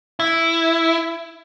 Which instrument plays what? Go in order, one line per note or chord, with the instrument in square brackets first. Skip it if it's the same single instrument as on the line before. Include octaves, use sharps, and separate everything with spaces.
[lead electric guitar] E4